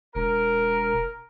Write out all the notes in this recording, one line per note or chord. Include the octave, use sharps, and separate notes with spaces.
E1 A#4